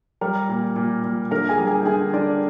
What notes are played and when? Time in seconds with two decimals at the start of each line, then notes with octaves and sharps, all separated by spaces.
0.21 G3 A#4 A#5
0.49 A#2
0.76 A#2
1.04 A#2
1.31 D3 A#4 A#5
1.49 G#4 G#5
1.58 G3
1.67 G#4 G#5
1.81 G5
1.85 D3 G#4 G#5
2.14 D3 D4 D5